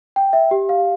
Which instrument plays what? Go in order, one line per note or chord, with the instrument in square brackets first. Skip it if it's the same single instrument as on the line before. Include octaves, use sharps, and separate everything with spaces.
[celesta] G5
E5
G4
F5